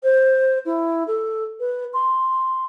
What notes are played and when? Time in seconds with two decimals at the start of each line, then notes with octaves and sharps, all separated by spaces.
0.03 C5
0.65 E4
1.08 A4
1.60 B4
1.94 C6